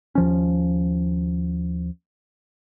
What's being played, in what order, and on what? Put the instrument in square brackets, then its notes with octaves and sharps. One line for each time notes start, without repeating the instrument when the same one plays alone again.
[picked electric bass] D#2 F3 C#4